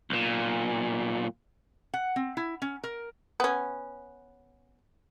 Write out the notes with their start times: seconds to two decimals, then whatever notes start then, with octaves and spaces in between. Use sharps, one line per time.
0.10 B1 A#2
1.94 F#5
2.16 C4
2.37 E4
2.62 C#4
2.84 A#4
3.40 B3 C#4